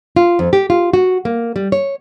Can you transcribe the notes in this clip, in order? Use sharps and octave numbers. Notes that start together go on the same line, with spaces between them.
F4
F2
G4
F4
F#4
A#3
G3
C#5